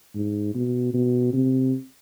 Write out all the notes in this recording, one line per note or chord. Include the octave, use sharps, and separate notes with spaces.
G#2
B2
B2
C3